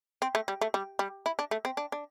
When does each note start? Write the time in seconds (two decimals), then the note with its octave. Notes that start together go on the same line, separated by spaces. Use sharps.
0.22 C4
0.35 A3
0.48 G3
0.61 A3
0.74 G3
0.99 G3
1.26 E4
1.39 D4
1.51 A3
1.65 C4
1.77 D4
1.92 D4